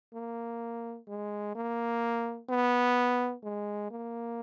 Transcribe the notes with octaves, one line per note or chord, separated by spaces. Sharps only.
A#3
G#3
A#3
B3
G#3
A#3